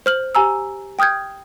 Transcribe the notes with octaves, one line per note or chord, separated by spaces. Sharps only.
C5 F6 F#7
G4 G#5 A#5 E6
G5 D#6 F6 G6 G#6